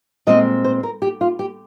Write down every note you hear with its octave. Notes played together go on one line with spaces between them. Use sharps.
A#2 G#3 C4 D#5
C5
A#4
G4
F4
G4